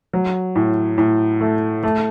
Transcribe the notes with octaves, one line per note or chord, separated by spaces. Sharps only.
F#3
A2
A2
A3
A3